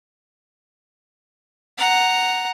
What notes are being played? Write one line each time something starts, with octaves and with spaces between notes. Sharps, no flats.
F#5 A#5